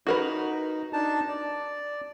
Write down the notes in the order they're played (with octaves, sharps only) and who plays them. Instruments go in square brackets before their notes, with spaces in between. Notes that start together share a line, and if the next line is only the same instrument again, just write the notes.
[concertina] D#4 [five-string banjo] F#4 A#4 B4
[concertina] D4 D#4 A5
D5